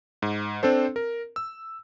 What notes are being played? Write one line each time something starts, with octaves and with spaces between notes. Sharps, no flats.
G#2
C4 D4 A4 C5
A#4
E6